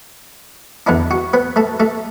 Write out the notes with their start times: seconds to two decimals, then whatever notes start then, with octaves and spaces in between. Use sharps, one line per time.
0.87 E2 D3 B3 D4 E4
1.11 F#4
1.34 B3 B4
1.56 A3 A4
1.80 A3 A4